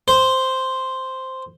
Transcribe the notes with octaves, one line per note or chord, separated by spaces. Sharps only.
C5